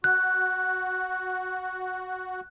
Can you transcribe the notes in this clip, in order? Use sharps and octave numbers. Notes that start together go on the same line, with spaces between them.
F#4 F#6